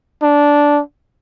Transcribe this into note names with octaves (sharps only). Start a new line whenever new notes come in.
D4